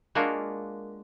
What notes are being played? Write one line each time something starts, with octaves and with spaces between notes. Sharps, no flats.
G#3 A#3 D4 F4 F#4 A#4